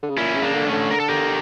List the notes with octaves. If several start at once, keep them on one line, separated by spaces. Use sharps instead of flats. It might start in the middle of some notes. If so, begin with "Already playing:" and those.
D3
C#3
A#2 C#4 E4
C#3
A#3 D4
D3
A3 C#4
D3
A#4
A4
G4 A#4